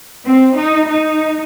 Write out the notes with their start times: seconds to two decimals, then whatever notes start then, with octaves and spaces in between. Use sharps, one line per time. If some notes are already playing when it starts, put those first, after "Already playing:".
0.26 C4
0.57 D#4
0.88 D#4